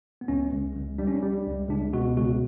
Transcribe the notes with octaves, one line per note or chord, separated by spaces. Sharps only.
B3
C#2 C#4
C#2
C#2
G3 D4
C#4
D4
G3
C#2
C#2 D4
B2 F#4
C#2 F#4